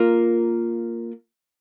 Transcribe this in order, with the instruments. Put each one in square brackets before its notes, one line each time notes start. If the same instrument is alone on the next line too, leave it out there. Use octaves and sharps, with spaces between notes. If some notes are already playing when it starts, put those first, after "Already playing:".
Already playing: [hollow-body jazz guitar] A#3 F4 A#4